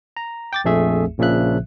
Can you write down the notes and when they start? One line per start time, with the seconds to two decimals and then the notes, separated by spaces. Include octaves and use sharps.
0.17 A#5
0.53 G5 D6 A6
0.65 A#1 F2 A3 G#4 E5
1.18 A#1 A#2 C#3 F3 E5 F#6